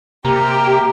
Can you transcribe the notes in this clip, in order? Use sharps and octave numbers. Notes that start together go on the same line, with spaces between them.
C3 A#3 G4